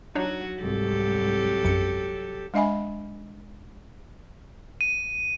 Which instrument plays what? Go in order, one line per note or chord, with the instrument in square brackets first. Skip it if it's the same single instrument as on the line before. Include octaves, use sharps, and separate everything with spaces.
[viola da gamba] F#3 F#4 [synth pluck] D4 D#4 C#5
[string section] C2 G#2 [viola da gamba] F#3 G4 A4
[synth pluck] A#1 F#2 C#7
[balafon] G#3 D4 D#5 E5 G#5 B5
[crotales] D#7